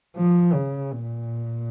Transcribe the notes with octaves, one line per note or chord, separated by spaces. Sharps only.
F3
C#3
A#2